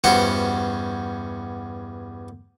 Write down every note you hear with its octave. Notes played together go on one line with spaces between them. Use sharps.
E2 G2 C#4 F#4 C5